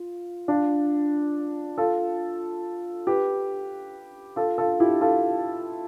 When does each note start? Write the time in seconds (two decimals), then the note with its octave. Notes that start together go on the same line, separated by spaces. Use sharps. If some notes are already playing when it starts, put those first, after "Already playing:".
Already playing: F4
0.48 D4 F4
1.78 F4 A4
3.07 G4 B4
4.36 F4 A4
4.58 F4 A4
4.80 E4 G4
5.01 F4 A4